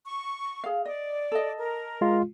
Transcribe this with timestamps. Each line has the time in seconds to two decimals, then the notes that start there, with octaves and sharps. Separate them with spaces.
0.07 C#6
0.64 G#4 F5
0.85 D5 D#5
1.32 A4 D#5
1.59 A#4
2.01 G#3 F4